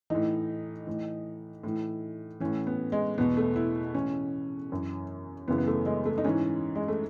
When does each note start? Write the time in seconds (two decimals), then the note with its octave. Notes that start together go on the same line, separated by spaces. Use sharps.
0.10 A2 E3 D#4
0.87 A2 E3
1.63 A2 E3
2.40 A2 E3 C#4
2.67 B3
2.92 G#3
3.18 E2 B2 B3
3.37 A3
3.56 E4
3.94 A2 E3 C#4
4.71 F#2 E3
5.48 F#2 C#3 E3 B3
5.58 B3
5.67 A3
5.86 G#3
6.06 A3
6.18 D#4
6.24 G#2 E3 C#4
6.75 G#3
6.88 A3